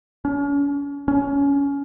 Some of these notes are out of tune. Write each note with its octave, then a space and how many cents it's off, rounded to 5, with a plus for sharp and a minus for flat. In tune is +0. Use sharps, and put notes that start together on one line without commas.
C#4 +40
C#4 +20